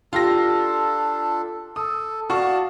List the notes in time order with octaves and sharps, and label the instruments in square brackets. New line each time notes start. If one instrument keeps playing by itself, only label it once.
[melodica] D4 A4 [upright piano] F4 G4 A#6
[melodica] A4 [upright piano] D#6
[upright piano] F#4 C#6 [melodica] D5 F5 A5